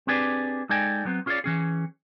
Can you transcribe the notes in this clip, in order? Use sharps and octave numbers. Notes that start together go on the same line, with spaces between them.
C4 D4 G4 G#4 B4 D5
G#3 D#4 A4 D5 G5 G#5
F#3 B3 C4
C#4 F4 G#4 B4 C#5 D5
E3 C#4 G#4